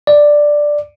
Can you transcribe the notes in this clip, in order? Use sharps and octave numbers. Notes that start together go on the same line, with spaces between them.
D5